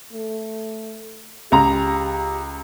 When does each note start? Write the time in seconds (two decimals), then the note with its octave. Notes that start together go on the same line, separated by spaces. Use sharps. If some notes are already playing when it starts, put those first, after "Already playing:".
0.13 A3
1.52 C#2 G4 A#5